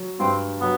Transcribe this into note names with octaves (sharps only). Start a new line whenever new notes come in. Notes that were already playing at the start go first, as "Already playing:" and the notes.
Already playing: F#3
G2 C4
F#3 B3